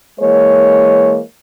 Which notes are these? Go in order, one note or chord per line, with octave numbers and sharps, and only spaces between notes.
E3 G#3 A#3 C#5